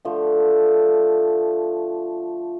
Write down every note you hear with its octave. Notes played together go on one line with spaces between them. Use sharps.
D3 F3 A3